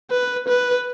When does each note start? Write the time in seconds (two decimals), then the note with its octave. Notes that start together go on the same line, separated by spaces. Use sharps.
0.11 B4
0.48 B4